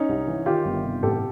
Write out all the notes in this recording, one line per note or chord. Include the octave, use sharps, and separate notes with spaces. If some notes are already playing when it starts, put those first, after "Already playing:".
Already playing: C#4 D#4
C2
E3
D#3 F4 G4
G1
C3
A1 G4 A4